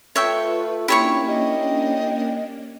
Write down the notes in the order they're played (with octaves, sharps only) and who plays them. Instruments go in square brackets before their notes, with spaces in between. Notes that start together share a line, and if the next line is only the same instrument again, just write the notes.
[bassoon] A3 [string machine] F4 B4 [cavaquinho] C#5 E5 G5
[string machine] A#3 C#4 D4 [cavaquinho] E4 C#5 C#6 [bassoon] G4
[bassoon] G4 [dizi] D#5